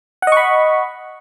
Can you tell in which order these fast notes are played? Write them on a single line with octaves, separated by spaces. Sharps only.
F#5 D#5 C#6 B5